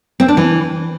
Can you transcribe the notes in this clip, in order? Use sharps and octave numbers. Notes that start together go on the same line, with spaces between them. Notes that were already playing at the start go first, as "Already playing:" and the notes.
C4
D4
E3